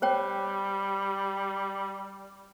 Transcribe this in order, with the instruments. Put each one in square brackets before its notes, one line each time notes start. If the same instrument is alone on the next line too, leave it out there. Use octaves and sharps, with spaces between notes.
[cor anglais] G3 [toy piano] C5 C#5 G5